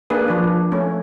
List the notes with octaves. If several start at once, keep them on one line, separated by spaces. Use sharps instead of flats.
A#3 D4 G#4 B4
F3 D4
A3 C#4